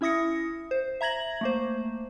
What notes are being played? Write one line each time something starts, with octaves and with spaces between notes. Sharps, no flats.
C#4 E4 E5 D#6 A#6 C#7
C5
E5 A#5 G#6 A#6 F#7
A3 A#3 C5